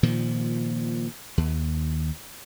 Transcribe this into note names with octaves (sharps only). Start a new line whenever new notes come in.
A#2 D#3 F3
D#2